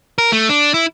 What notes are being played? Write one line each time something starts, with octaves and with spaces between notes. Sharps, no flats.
A#4
A3
D4
E4